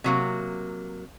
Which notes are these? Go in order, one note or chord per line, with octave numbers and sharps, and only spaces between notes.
C3 F#3 A#3